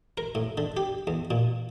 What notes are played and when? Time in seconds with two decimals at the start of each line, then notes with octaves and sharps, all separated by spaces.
0.18 A#4
0.35 A2
0.58 D3
0.77 G4
1.07 E2
1.31 A#2